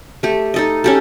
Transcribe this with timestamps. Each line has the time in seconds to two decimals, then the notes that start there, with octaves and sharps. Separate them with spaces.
0.23 A3 G4
0.54 D#4 A4 D#5
0.84 C#4 G4 A4